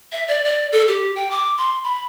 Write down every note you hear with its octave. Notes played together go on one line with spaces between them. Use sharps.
E5
D5
D5
A4
G4
G5
D6
C6
B5